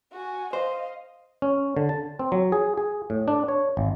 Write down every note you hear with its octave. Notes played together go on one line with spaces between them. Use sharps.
F#4 G#5
C5 D#5 F5
C#4
D3
A5
C4
F#3
G#4
G#4
A2
D4
C#5
G#1